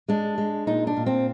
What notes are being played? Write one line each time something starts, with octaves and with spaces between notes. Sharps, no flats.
G#3 D4
G#3
A#2 D#4
D4
A#2
C4